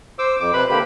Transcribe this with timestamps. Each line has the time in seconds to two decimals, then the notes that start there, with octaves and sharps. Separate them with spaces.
0.19 C5 D6 E6
0.40 F2 D6
0.53 C3 B4 B5
0.70 D3 A#3 G4 B5